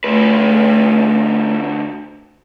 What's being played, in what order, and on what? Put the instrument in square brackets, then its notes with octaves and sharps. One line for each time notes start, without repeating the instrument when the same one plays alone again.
[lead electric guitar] D2 B4 [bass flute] A3